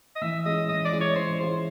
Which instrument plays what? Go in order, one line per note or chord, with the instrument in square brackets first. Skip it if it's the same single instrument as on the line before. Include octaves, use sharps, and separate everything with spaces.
[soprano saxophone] D#5
[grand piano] E3 [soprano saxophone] E5
[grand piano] G#3 C#4 E4 [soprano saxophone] D#5
[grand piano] E3 [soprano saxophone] D#5
[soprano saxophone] D5
[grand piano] G#3 C#4 E4
[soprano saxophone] C#5
[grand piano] E3 [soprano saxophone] C5
[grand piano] G#3 C#4 E4 [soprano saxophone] C5